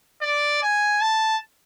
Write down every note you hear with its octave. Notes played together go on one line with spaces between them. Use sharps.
D5
G#5
A5